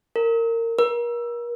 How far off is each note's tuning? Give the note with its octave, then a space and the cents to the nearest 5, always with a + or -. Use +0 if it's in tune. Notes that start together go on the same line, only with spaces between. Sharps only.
A#4 -25
A#4 +35